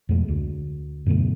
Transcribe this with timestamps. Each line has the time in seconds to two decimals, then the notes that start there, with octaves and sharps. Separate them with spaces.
0.09 F2 B2 G#3 A3
0.28 D2
1.06 F#2 B2 D3 A3